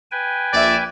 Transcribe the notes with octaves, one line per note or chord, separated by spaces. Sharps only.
B4 G5 G#5
A#1 D5 E5